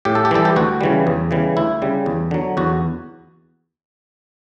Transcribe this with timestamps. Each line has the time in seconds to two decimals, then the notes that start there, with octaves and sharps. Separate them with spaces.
0.05 A2 G4
0.15 A4
0.25 G4
0.31 E3 G3 A4
0.45 G4
0.56 D2 F#4
0.81 C#3 E3 G3
1.07 E2
1.31 C#3 E3 G3
1.57 D2 E4
1.82 C#3 G3
2.06 E2
2.31 D3 F#3
2.57 E2 F#4